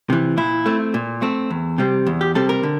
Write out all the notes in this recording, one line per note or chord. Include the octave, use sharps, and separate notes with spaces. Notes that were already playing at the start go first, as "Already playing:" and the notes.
C3 E3
A#2 E4
A3 C4
A#2
A3 C4
E2
C3 G3 C4
E2
G4
C3 G3 C4 A4
A#4
D3